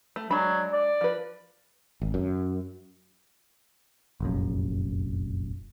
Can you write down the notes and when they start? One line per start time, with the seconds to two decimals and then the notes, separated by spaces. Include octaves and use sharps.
0.16 A3
0.30 F#3 G#3 D4 B5
0.73 D5
1.01 F3 B4
2.02 G#1
2.14 F#2
4.21 F1 A#1 F#2